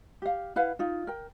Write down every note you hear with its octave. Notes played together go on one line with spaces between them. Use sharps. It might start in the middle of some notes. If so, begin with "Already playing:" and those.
G4 F5
E4 B4 F5 F#5
D#4 F4
A#4 G5